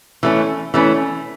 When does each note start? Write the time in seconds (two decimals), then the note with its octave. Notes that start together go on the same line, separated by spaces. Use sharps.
0.23 E3 A3 C#4
0.74 E3 A3 C#4